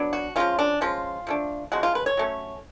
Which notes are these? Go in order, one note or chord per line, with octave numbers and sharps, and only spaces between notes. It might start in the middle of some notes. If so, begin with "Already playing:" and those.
Already playing: F#3 B3 D4
F#4
F3 G#3 C#4 F4
D4
F3 G#3 C#4 F4
F3 A3 D4
C#3 F3 G#3 F#4
F4
B4
C#5
F#3 A3 C#4